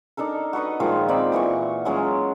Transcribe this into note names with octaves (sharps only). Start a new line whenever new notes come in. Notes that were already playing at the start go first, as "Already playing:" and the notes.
D4 D#4 A4 A#4
F#4 A4 B4 D#5
A#2 D#3 F3 G#3
C4 D#4 D5 B5
A#2 E3 F#4 C#6
F#3 G#3 C#4 F4